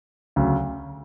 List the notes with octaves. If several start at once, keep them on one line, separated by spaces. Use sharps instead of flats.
D2 C#3 F#3